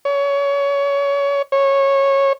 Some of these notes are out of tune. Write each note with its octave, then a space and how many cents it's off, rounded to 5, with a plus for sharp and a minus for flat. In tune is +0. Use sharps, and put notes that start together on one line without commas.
C#5 +25
C#5 -15